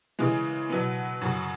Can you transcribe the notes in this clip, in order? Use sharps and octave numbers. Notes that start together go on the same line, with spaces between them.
C#3 E3 G#3
B2 F#3 B3
F#2 C#3 F#3